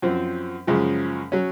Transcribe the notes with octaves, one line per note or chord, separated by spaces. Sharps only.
F#2 F3 C4
F#2 C#3 F3 G#3
F#3 C#4